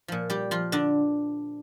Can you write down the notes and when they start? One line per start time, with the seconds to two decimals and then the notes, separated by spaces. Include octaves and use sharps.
0.08 A#2 F3
0.30 G3 G4
0.51 F3 F4
0.72 D3 D4